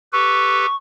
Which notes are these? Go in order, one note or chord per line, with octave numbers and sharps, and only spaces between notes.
G4 A4 B4 C#6